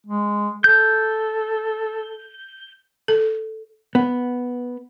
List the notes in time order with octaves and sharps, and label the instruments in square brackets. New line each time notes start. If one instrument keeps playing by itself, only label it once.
[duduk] G#3
[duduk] A4 [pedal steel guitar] G6
[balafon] A4
[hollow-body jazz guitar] B3